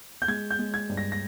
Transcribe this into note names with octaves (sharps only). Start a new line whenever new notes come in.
G6
G#3 G#6
G6
G#3
G#6
G2
A#6
A#6